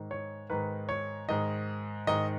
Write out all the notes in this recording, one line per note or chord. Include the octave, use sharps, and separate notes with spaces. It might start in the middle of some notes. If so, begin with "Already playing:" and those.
Already playing: G#2 D#3
C#5
G#2 D#3 B4
C#5
G#2 D#3 D#5
G#2 D#3 D#5